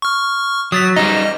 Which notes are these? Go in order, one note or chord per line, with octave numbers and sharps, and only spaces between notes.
C#6 F6
F#3 D#6 A6 B6
G3 D#4 D#5